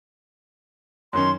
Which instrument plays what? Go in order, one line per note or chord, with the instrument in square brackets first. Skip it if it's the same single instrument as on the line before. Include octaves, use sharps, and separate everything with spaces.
[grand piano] F#2 D#3 C#4 [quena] C6